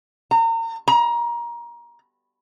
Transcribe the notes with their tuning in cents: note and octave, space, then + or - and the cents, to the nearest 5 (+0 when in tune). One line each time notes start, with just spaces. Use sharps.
A#5 -35
A#5 +25